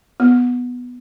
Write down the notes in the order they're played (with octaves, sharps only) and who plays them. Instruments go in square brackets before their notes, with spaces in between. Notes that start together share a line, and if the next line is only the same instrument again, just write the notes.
[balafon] B3